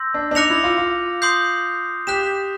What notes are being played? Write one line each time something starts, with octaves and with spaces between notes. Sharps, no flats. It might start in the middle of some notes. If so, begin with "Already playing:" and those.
Already playing: C6 E6 G6 A#6
D4
D4
D#4 D6 F#6 A#6 C#7 F7
E4
F4
F4
C6 D#6 G6 C7
G4 F#6 B6 E7